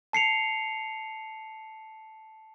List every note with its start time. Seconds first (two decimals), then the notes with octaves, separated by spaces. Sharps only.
0.13 A5 C7 C#7 F7